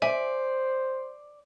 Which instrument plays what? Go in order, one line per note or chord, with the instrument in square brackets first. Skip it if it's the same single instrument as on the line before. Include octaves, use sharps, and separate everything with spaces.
[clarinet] C5 [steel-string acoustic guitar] D5 [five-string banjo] E5 [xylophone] G#5